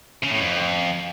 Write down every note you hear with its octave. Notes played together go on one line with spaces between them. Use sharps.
C#3
A2
F2